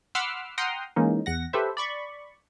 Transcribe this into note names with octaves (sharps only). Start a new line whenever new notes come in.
F#5 B5 C6 D6 E6 F6
F#5 G5 A#5 C6 D#6 F6
E3 G#3 A#3 C#4 D#4
E2 F#5 A#6
G4 A4 B4 C5 E5
D5 B5 C#6